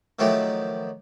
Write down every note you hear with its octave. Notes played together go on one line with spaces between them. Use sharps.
D#3 F3 F#3 A3 E4 G4